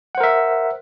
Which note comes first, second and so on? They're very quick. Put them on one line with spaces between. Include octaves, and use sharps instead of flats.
F#5 C5 A#4 E5